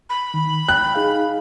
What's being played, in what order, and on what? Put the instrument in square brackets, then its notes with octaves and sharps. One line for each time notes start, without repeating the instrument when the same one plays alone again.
[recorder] B5
[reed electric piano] D#3
[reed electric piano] G5 [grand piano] F#6
[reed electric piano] D#4 G#4 F5